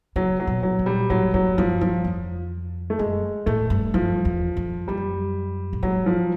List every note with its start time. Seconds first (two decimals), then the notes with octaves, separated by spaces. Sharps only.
0.16 C#3 F#3
0.40 F#3
0.47 B2
0.63 F#3
0.79 A#2
0.86 G3
1.10 A2 F#3
1.34 G#2 F#3
1.58 G2 F3
1.81 E2 F3
2.04 F2
2.90 A3
2.99 F#2 G#3
3.46 A2 A3
3.70 G2
3.94 F#2 F3
4.25 E2
4.57 F2
4.88 F#2 G3
5.73 A2
5.83 G#2 F#3
6.06 F3